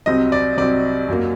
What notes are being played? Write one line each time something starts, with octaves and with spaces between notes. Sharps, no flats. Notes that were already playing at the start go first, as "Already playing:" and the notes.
C2 C3 F#3 C4 D#5
D5
C2 C3 F#3 C4 D5
F#2 F#3 A#3